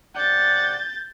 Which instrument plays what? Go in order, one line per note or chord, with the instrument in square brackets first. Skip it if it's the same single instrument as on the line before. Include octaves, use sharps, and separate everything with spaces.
[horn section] C3 D5 F#5 [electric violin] G6 A6